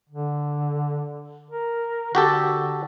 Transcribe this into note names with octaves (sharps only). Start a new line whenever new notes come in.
D3
A#4
D3 F#4 G4 A4